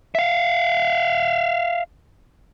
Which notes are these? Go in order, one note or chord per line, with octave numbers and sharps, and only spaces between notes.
E5 F5